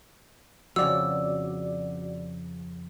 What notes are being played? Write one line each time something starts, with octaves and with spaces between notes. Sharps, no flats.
F2 C#3 F#4 D5 E6